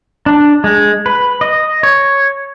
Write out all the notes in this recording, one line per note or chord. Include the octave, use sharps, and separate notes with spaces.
D4
G#3
B4
D#5
C#5